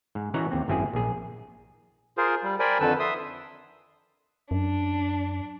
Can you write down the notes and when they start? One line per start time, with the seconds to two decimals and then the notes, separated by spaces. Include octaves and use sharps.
0.15 G#2
0.34 E3 C#4 D#4 F#4 F#5 A#5
0.52 D#2 C4
0.68 G#1 F#2 C4 E4 G#4
0.93 A#1 G#4
2.18 F4 G#4 A#4 C5
2.43 G3
2.60 A#4 C5 D5 G5 G#5 B5
2.80 F2 D3 D#3 A4 B4 E6
3.00 E5 C6 D#6
4.51 F#2 D4